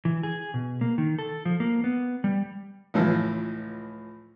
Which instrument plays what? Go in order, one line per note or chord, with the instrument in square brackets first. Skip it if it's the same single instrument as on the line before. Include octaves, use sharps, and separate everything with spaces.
[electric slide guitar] E3
G#4
B2
A#3
D#3
A4
F3
A#3
B3
G3
[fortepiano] C#2 A2 E3 F3